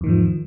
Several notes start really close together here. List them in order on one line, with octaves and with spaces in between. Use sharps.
E2 D#3 G#2 F3